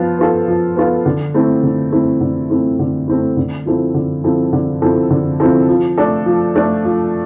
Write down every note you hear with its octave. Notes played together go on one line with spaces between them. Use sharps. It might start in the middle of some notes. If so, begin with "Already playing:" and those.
Already playing: F3 B3 F4
B3 F4 A4
F3
B3 F4 A4
D3
A3 C4 E4
D3
A3 C4 E4
D3
A3 C4 E4
D3
A3 C4 E4
D3
F3 C4 E4 A4
D3
F3 C4 E4 A4
D3
F3 C4 E4 A4
D3
F3 C4 E4 A4
F3
A3 D4 A4
F3
A3 D4 A4
F3